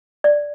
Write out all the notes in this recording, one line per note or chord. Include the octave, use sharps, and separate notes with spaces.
D5